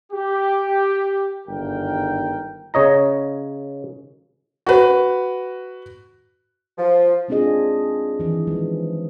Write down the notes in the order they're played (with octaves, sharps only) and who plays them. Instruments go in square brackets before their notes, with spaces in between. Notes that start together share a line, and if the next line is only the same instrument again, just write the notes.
[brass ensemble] G4
G1 G#2 D#3 A#4 G5
[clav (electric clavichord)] C#3 C#5 D#5 A#5
[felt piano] F#4 B4
[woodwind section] F3
[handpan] G#3 C4 D4 F4 G#4 D#5
D#3 E3
F3 G#3